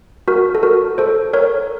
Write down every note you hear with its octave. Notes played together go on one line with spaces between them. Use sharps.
F#4 A#4
A4
F#4 A#4
A4 C5
A#4 C#5